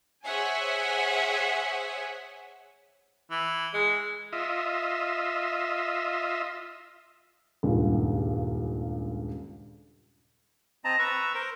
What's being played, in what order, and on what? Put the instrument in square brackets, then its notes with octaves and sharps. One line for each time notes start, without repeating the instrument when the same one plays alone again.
[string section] G#4 C5 C#5 E5 F#5 G#5
[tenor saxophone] E3
G#3
[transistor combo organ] F4 D#5 E5
[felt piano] D#1 C#2 G2 C#3
[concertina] C4 D#5 A5 A#5
B4 A#5 C#6 E6
A#4 C5